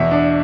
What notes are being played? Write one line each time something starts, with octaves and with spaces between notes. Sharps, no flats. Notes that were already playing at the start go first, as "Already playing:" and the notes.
Already playing: E2 B2 E5
D4